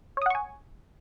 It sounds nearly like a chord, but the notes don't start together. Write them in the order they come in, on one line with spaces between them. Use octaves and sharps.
C#5 D#6 F#5 C#6 G#5